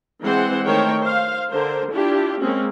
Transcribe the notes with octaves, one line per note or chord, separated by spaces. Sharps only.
E3 G#3 C4 C5 F#5
D#3 A3 A#4 C5 C#5 G5
C5 F5
D3 A#4 C5
D4 E4 F4 G4
G#3 A#3 C4 C#4